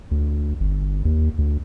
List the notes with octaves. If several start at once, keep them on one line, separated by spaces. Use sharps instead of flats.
D2
G1
D#2
D2